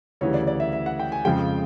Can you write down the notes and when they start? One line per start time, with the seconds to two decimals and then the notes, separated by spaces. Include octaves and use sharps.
0.21 D2 C#3 E3 G3 C#5
0.34 D5
0.47 D5
0.60 E5
0.73 E5
0.86 F#5
0.99 G5
1.12 G#5
1.25 F2 C#3 F3 G#3 G5